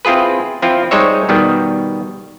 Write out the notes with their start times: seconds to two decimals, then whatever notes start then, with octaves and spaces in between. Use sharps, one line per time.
0.05 C4 E4 F4 G#4 B4
0.62 F3 C4 E4 F4
0.91 G3 G#3 D#4 C5 C#5 E5
1.29 B2 D#3 G3 B3